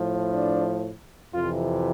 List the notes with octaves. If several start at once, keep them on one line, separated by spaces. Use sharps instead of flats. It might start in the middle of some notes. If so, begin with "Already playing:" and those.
Already playing: A2 F3
D4
F2 C3 E3 F4